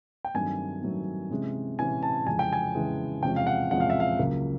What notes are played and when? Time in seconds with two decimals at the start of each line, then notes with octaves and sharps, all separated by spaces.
0.25 G5
0.34 G2 D#3 F#3 A3 C4 G#5
0.82 G2 D#3 F#3 A3 C4
1.30 C3 E3 G#3 C#4
1.79 C3 E3 G#3 C#4 G#5
2.02 A5
2.27 F2 C#3 E3 G#3 G#5
2.39 G5
2.53 G#5
2.75 F2 C#3 E3 G#3
3.23 E2 C3 F3 G#3 C#4 G5
3.36 F5
3.47 F#5
3.71 E2 C3 F3 G#3 C#4 F#5
3.80 F5
3.90 E5
4.00 F5
4.19 C#2 C#3 F#3 A#3